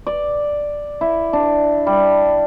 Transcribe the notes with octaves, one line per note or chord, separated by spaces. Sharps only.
D5
E4
D4
G3